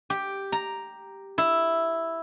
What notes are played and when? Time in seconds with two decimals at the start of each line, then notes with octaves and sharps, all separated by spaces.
0.10 G4
0.52 A#5
1.38 E4